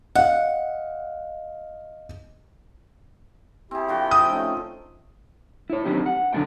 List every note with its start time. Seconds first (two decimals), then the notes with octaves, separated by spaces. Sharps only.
0.15 D#5 F5 F#5
3.71 C4 E4 G4 G#4
3.88 D3 F3 F#4 G5
4.11 E5 D#6
4.28 F3 A3 C#4 D#4
5.70 E4 C#5
5.85 D#3 F#3 C4 D4 D#4 G4
6.06 F#5
6.33 F2 D3 F#3 A#3 F#5 G5